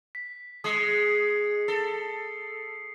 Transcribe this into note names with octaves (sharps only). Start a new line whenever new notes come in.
B6
G#3 D#6 C7 C#7
A4